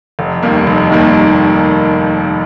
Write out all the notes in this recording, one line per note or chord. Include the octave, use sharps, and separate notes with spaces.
F1
D#2 D#3 G3 A#3
F1
D#2 D#3 G3 A#3